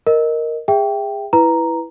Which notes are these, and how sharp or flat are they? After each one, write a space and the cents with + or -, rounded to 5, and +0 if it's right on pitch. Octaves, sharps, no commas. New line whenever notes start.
A#4 +0 D#5 +0
G#4 -25 E5 +0 G5 +0
E4 +0 B4 +0 A#5 +0